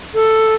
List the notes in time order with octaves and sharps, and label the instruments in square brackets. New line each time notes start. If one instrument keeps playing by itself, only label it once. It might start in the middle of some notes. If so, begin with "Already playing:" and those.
[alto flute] A4